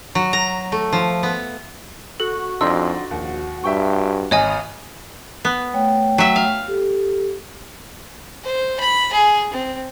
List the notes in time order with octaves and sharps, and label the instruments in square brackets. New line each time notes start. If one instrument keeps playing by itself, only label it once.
[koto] F#3
A#5
A3
F3
B3
[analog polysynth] F#4 [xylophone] A4
[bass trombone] F2 [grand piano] D4 D#4 C6 [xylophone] E6
[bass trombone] A#1 [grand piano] D#2
[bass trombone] G2 [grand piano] E5 G5 C#6
[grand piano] G#1 [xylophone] C#5 D#5 G#5 [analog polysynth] D#6 F6
[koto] B3
[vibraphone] A3 C#5 G5
[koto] F#3 E5
F5
[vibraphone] G4 A4
[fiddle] C5
B5
G#4
C4